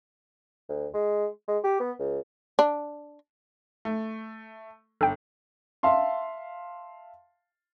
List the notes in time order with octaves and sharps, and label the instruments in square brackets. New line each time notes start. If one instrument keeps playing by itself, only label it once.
[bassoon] D2
G#3
G#3
G4
B3
C#2
[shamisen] D4
[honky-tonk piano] A3
[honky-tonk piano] G1 [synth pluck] A4 G5
[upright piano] E5 F5 A5 C6